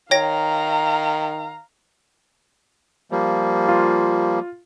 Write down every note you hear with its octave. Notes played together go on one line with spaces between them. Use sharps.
D#3 C#5 F5 G5 A#5 A#6
F3 G3 A#3
F4